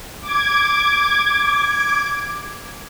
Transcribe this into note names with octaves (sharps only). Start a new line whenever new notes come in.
D6 G#6